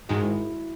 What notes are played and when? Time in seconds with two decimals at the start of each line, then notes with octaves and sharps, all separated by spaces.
0.09 G#2 D#3 G#3 F#4
0.23 E4